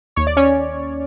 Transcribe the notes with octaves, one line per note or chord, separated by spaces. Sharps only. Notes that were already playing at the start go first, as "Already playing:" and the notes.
D#2 C#5
D5
C#4 C#5